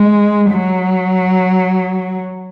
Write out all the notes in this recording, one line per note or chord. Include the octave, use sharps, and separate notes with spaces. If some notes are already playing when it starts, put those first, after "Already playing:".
Already playing: G#3
F#3